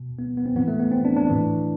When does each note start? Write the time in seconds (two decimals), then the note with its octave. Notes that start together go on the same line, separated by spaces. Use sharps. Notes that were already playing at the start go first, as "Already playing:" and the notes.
Already playing: B2
0.19 B3
0.37 B3
0.46 C4
0.55 A2 E3 B3
0.68 A3
0.80 B3
0.92 C4
1.05 D4
1.17 D4
1.29 A2 E3